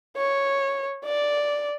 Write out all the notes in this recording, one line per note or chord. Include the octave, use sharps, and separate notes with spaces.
C#5
D5